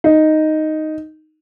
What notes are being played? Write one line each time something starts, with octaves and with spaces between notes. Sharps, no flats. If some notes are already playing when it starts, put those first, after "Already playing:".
D#4